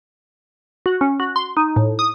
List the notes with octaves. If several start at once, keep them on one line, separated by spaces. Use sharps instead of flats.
F#4
C#4
F#4
C6
D#4
A2
D#6